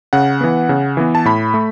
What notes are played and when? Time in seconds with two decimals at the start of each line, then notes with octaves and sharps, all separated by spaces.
0.13 C#3 F#5
0.41 E3 B3
0.69 C#3
0.97 E3 B3
1.15 A5
1.25 A2 B5
1.54 A3